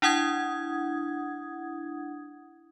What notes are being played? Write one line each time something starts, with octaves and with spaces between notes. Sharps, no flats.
D4 E4 F#5 D#6 G#6